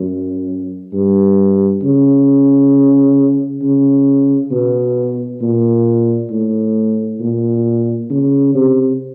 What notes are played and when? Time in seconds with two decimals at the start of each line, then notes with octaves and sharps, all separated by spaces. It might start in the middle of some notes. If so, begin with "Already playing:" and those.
Already playing: F#2
0.93 G2
1.83 C#3
3.62 C#3
4.51 B2
5.42 A#2
6.31 A2
7.20 A#2
8.10 C#3
8.55 C3